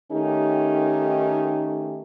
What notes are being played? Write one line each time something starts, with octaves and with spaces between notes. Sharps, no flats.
D#3 A3 C#4 D#4 G4